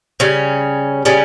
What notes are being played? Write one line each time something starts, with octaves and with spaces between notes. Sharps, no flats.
C#3 G3 C#4
C#3 G3 C#4